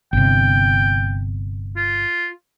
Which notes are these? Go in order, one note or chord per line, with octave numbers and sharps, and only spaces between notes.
G1 C3 G5
F4